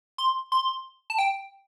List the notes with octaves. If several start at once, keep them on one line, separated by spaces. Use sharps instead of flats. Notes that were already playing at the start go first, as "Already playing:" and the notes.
C6
C6
A5
G5